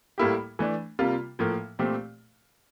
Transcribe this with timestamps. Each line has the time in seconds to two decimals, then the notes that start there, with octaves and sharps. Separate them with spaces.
0.18 A2 G3 A#3 E4 G4
0.59 E3 A3 D4
0.99 C3 G3 A#3 F4
1.39 A2 F3 A#3
1.79 A#2 A3 C4 G4